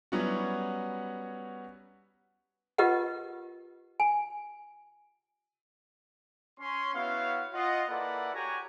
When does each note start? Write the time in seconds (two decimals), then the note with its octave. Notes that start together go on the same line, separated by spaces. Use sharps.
0.12 F#3 G3 B3 C#4 E4 F#4
2.78 F4 G4 A#4 B4 D#5 F#5
4.00 G#5
6.60 C#4 C#5 C6
6.95 B3 E4 F#4 C#5 F5
7.54 F4 D#5 F#5
7.89 A#3 E4 A4 B4 D5 F#5
8.33 F#4 G4 C#5 F#5 G#5 A#5